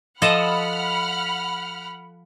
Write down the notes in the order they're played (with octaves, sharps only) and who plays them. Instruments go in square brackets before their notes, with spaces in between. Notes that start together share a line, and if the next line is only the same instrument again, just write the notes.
[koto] F3 A4 D#5 [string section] F#5 B5 F6